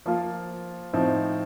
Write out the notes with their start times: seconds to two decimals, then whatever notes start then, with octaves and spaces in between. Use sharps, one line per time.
0.06 F3 A#3 F4
0.93 A2 F3 C4 D#4